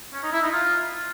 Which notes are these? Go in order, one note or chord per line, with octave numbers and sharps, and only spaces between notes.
C#4
D#4
E4
D#4
F4